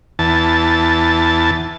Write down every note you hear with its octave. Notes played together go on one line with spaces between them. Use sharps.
E2 A5